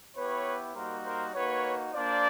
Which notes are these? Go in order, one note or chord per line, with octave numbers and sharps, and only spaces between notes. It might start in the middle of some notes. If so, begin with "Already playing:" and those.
B3 E4 G4 B4 C#5
G3 A#3 D#4 F#4 A#4 C5
A#4 C5
A#3 D#4 F#4 B4 C#5
A#3 D4 F4 C5 D5